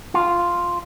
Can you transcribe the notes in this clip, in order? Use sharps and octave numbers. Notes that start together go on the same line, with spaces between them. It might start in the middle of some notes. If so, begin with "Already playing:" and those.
F4